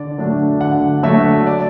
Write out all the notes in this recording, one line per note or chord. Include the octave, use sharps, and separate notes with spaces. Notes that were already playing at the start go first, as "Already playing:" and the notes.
Already playing: D3 D5
F#3 A3 D4
D3 F#5
F#3 A3 D4 E5
D5